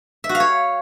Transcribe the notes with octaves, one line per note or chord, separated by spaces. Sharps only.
E5
F#4
F5
C#5